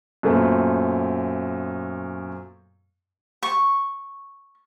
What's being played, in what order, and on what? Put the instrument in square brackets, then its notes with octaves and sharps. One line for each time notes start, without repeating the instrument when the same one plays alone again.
[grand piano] F#2 A#2 A3 B3 C4
[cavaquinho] C#6